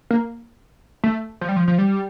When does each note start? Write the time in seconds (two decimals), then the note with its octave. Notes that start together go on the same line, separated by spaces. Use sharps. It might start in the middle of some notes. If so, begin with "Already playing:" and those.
0.11 A#3
1.04 A3
1.41 F3
1.49 G3
1.56 F3
1.68 F3
1.78 G3